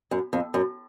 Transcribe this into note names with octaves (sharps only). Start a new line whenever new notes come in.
F#2
F2
F#2